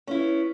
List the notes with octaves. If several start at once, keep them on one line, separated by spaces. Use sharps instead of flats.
B3 C#4 E4